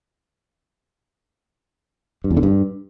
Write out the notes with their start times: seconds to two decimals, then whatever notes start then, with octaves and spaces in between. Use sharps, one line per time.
2.24 G2
2.31 E2
2.37 D3
2.43 G2